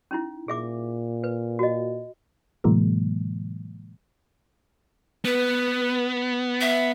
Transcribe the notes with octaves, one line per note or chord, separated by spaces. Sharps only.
C#4 D#4 E4
A#2 G#4 E5 D6
B4
F#4 D#5
A2 C3 E3 F#3 G#3 A#3
B3 B4
E5